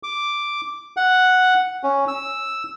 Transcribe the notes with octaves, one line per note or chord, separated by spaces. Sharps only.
D6
F#5
C#4
E6